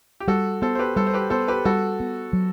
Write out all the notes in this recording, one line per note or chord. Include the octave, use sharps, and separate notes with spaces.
G4
G3 F#4 A4
B3 A4 C5
C5
G4 B4
G3 A4 C5
C5
G4 B4
B3 A4 C5
G4 B4
G3 F#4 A4
B3
F#3